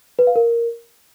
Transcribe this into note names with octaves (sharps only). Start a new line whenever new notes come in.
B4
F5
A#4